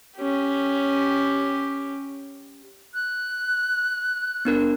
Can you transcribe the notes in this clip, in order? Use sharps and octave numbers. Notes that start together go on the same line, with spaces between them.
C#4 G4
F#6
B3 D4 A#4